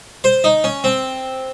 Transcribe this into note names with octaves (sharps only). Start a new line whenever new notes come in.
C5
D#4
C#4
C4